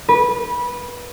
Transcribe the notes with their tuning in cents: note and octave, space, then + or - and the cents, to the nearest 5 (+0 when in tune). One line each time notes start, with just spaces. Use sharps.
B4 -20